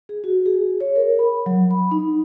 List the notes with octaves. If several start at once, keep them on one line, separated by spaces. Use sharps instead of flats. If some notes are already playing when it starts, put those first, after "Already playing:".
G#4
F#4
G#4
C#5
A#4
B5
F#3
B5
D#4